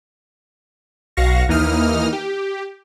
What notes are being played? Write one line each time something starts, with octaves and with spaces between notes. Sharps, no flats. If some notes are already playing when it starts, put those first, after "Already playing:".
B1 F#4 F5 C#6 A#6
D#2 E3 A#3 D#4 D#6 F6
G4